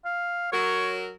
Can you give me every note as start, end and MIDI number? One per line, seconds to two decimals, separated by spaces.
0.05 0.48 77
0.52 1.10 54
0.52 1.10 70
0.52 0.97 73